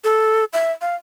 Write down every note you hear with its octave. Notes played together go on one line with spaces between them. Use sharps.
A4
E5
F5